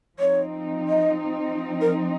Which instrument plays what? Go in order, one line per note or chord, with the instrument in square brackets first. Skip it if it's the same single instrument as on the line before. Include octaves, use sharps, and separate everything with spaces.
[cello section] F3 C4 D#4 [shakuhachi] C#5
[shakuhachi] D#5
A#4